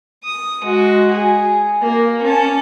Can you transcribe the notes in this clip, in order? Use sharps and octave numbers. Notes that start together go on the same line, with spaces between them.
D#6
G#3 F#4
G#4
A#3
C#4 A5